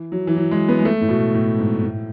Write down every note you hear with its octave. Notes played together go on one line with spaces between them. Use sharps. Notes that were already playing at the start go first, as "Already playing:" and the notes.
Already playing: E3
F#3
E3
F#3
G#3
B3
G#3
A3
A2
B2
A2
G#2
A2